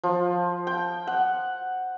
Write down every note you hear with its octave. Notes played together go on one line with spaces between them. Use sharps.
F3
G5
F#5